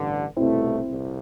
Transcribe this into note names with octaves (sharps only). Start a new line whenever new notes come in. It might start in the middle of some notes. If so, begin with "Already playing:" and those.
Already playing: A1 G2 D3
C2 B2 A3 C4 E4
C2